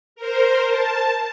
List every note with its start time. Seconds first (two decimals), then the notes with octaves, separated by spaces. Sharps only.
0.16 A#4 C5
0.69 A5